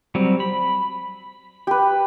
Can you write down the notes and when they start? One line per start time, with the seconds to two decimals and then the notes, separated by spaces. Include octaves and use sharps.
0.15 F#3 G3 C4
0.40 B5
1.67 G4 B4